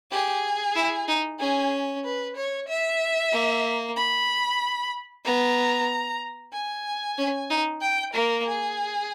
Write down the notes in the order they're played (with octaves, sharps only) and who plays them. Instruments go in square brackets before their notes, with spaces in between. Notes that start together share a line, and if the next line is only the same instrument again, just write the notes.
[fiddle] G4 [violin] G#4
[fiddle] E4
D#4
[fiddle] C#4 [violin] G#4
[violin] B4
C#5
E5
[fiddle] A#3
[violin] B5
[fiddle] B3 [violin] A#5
[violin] G#5
[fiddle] C#4
D#4
[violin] G5
[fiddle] A#3 [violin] A#4
[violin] G#4